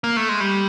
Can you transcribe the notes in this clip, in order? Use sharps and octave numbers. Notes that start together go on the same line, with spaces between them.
A#3
A3
G#3
G3